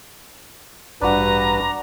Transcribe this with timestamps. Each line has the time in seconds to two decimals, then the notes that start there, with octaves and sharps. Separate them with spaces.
1.01 A1 G2 D4 F#4 B4 A#5